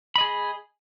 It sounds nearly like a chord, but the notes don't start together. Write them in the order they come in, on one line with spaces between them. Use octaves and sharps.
B5 D#5 G#4